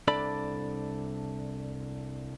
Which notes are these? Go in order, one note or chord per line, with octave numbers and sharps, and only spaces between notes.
C2 D4 A4 D5 B5